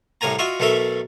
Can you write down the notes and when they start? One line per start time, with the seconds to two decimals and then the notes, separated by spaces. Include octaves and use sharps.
0.21 C2 A2 A#4 G#5 A#5
0.39 F4 F#4 D#5 E5
0.60 B1 B2 A3 A4 A#4 E5